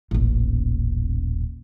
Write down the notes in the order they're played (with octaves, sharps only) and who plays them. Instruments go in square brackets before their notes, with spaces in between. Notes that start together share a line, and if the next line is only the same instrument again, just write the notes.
[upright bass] D#1 A1